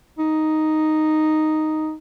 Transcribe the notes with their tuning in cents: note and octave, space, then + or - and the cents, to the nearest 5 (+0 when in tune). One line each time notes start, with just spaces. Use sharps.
D#4 +0